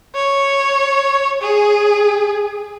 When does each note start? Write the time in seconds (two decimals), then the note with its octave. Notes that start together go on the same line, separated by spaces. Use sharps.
0.15 C#5
1.42 G#4